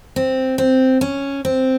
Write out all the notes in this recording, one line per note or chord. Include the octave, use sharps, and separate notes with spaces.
C4
C4
C#4
C4